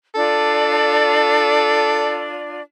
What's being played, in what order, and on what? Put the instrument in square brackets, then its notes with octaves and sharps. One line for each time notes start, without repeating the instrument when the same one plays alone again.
[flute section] D4 F4 D5 [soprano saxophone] A4